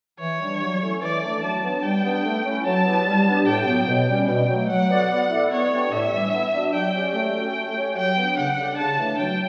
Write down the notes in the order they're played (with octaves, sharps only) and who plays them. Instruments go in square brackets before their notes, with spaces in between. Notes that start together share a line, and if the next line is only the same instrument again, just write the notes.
[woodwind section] E3 [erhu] C#5
[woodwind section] G3 D4
F#3
A3 C#4 E4 A4
[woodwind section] E3 [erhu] D5
[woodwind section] A3 D4
[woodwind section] F#3 [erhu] A5
[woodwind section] B3 D4
[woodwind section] G3 [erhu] G5
[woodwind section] B3 D4
A3
C#4 E4
[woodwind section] F#3 [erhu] A5
[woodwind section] B3 E4 G4 B4
G3
B3 D4 G4
[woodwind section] A2 [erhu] G5
[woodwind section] F#3 B3
B2
G3 C#4
[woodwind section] B2 [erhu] G5
[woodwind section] F#3
A3
[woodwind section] F#3 [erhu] F#5
[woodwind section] B3 F#4 A4 D5
B3
E4 A4 D5
[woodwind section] B3 [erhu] C#5
[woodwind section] D4 G4 B4 D5
[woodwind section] A2 [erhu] E5
[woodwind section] E3 G3 D4
B3
D4 F#4
[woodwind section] F#3 [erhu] G5
[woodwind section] C#4 G4 D5
[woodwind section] A3 [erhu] G5
[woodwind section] C#4 F#4 A4
A3
C#4 G4 C#5
[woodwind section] F#3 [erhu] G5
[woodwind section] B3 D4
[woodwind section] C#3 [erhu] F#5
[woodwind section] G3 D4 A4 D5
[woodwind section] C#3 [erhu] A5
[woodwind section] E3 A3 D4
[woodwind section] F#3 [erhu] G5